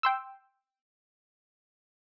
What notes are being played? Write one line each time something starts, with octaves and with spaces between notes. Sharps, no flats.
G5 C6 E6